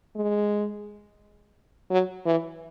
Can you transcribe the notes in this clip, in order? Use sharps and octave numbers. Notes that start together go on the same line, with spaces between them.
G#3
F#3
E3